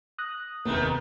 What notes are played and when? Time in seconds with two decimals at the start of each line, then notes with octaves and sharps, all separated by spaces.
0.18 D#6 F#6 A#6
0.65 F1 D#2 D#3 G#3 A3 B3